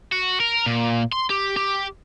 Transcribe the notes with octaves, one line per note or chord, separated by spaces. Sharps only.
F#4
A#4
A#2
C6
G4
G4